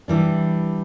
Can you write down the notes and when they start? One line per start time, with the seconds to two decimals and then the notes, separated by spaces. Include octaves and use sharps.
0.08 E3 G3 D4